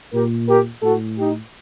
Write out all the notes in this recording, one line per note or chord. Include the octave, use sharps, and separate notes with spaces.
A#2 G4 A#4
G4 A#4
A2 F#4 A4
D#4 G4